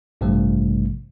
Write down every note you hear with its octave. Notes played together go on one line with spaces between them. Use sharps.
A1 G2 C3 F3 G3 A3